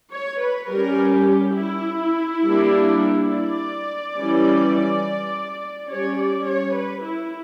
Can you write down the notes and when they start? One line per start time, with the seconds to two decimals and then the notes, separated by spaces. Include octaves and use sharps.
0.12 C#5
0.41 B4
0.70 G3 C#4 A#4
1.13 G4
1.57 E4
2.43 G3 A#3 D4
3.29 D5
4.15 E3 G3 C#4
5.89 G3 C#4 C#5
6.18 D5
6.47 C#5
6.75 B4
7.04 E4